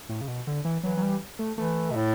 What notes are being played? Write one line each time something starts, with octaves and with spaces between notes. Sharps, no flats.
A2
C#3
B2
D3
E3
E3 F#3
F#3
G3
A3
E3 A3
B2
A2